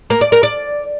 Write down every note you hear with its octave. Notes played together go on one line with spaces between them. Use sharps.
A#3
D5
A#4
D5